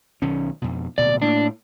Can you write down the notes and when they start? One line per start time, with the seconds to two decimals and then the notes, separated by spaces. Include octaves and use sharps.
0.22 B1 D#3 C#4
0.62 F2 B2
0.98 D1 B2 D5
1.22 A2 A#3 D4